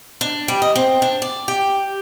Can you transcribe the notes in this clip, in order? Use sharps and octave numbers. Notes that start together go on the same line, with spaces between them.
D4
G3
D#5
C4
D4
D5
G4